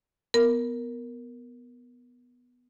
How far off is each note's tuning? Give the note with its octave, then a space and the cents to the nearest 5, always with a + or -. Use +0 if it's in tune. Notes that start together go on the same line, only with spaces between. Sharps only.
B3 +0 A#4 +0